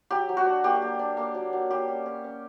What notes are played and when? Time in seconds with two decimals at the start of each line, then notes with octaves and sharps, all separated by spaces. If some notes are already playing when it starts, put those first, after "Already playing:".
0.11 F#3 G4
0.29 F#3
0.37 F#4
0.46 D4
0.64 A#3 G4
0.82 A#3
0.99 D4
1.17 A#3
1.34 F#3
1.53 F#3
1.70 G3 G4
1.88 C#4
2.06 C#4
2.24 C#4